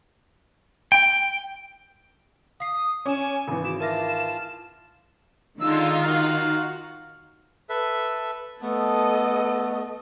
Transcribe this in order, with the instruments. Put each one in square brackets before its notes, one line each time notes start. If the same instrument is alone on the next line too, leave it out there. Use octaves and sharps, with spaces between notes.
[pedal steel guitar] G5
[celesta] F5 C7 [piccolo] D#6
[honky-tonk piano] C#4 [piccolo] G#5 [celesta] D6 E7
[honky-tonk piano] G#1 E3
[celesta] F#4 [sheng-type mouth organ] D6 [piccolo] E7
[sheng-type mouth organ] F4 A5 [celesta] A#4 E5 A#6
[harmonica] D3 G#3 E6 [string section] D#3 D#4 F4
[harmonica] F#4 F5
[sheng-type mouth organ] A4 B4 E5
[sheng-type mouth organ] A3 B3 [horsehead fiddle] A4 D#5